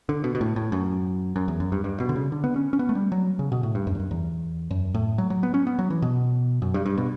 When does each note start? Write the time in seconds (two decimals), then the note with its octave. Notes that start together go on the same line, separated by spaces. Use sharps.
0.09 D3
0.24 B2
0.35 B2
0.41 A2
0.56 A2
0.72 F#2
1.36 F#2
1.48 E2
1.60 F#2
1.72 G2
1.84 G2
2.00 B2
2.09 D3
2.16 C#3
2.32 D3
2.44 B3
2.56 C#4
2.73 C#4
2.79 B3
2.89 A3
2.95 G3
3.12 F#3
3.39 C#3
3.52 B2
3.63 A2
3.75 G2
3.87 F#2
3.95 E2
3.99 F#2
4.11 E2
4.71 F#2
4.94 A2
5.18 F#3
5.30 F#3
5.43 B3
5.54 C#4
5.67 B3
5.79 F#3
5.90 E3
6.02 B2
6.62 F#2
6.74 G2
6.86 G2
6.97 B2